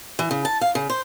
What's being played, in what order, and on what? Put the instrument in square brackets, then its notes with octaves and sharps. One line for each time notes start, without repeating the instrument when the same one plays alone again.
[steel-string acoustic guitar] E3
C#3
A5
F5
C#3
C5